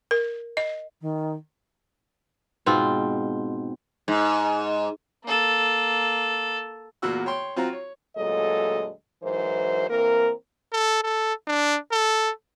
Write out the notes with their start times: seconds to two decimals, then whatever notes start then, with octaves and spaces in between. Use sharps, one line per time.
0.11 A#4
0.57 D#5
1.01 D#3
2.66 G#2 B2 C4 F4
4.08 G#2
5.25 A#3 A4
7.02 E2 A#2 A#3 F#4 E6
7.26 C#5 G5 C6
7.56 C4 F4 F#4 A#5
7.73 C#5
8.16 D2 A#2 F#3 G#3 A4 D#5
9.23 G#2 E3 F#3 E4 A#4 C5
9.89 E3 A#3 C4 A#4
10.73 A4
11.04 A4
11.48 D4
11.92 A4